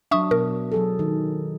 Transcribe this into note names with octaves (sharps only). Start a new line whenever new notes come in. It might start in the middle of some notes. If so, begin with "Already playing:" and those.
F#3 D4 E5 C#6 D#6
B2 A#4
F#3 G#4 A4
D#3